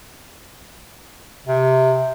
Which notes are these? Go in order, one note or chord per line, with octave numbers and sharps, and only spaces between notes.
C3